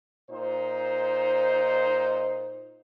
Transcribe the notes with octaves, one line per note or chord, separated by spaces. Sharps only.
A#2 D#4 C5